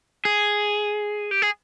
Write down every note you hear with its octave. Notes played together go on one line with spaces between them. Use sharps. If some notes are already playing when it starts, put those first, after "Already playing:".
G#4
G4
G#4